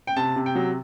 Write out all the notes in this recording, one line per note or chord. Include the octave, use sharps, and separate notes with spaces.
G5
C3 A5
C3
G5
F#3